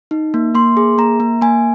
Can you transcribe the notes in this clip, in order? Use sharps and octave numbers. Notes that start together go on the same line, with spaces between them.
D#4
A#3
A#3 C6
G#4
A#3 A#5
A#3
A#3 G#5